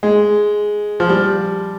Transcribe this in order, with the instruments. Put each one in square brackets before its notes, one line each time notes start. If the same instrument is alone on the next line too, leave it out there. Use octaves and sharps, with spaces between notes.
[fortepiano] G#3
F3
G3